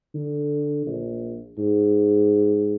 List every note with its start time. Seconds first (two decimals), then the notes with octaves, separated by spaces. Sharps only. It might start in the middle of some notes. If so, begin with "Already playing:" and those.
0.14 D3
0.86 A#1
1.58 G#2